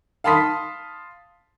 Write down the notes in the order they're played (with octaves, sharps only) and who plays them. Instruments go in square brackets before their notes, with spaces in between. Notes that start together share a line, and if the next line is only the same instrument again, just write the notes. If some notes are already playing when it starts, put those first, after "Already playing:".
[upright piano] F5 A5 B5 C6 D#6 B6